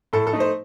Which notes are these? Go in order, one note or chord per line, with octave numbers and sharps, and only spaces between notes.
A2 A4
A4
A3 D#4
C5